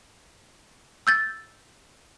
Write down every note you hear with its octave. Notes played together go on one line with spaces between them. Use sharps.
E6 G6 A6